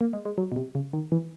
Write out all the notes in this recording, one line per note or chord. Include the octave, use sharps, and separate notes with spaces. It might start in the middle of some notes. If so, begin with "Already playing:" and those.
A#3
G#3
G#3
F#3
B2
C3
C#3
D#3
E3